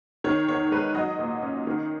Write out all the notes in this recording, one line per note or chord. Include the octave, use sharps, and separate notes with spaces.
D#3 C#5
E2 C#5
G#3 B4
F#3 D#5
A#2
C#4
D#3